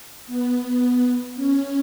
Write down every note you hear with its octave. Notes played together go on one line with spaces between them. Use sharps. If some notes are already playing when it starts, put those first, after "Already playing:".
B3
C#4